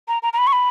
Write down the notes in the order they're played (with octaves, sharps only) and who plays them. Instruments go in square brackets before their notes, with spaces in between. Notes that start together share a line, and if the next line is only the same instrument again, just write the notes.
[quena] A#5
A#5
A#5
B5
C#6
B5